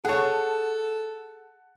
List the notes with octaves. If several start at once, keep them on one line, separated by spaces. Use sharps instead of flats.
G#4 A4 C#5 F#5 A5